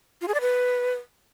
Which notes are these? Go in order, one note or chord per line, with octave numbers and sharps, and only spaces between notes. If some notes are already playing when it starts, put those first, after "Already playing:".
F4
G#4
D5
B4